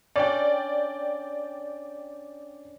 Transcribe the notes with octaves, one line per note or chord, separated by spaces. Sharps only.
C#4 D4 D5 G5